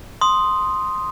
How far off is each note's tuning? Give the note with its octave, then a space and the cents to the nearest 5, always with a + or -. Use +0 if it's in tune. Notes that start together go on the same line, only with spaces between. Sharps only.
C6 +0 D#6 +0